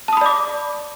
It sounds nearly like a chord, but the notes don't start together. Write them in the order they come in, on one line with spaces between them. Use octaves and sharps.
A5 D#6 B5 D5 D6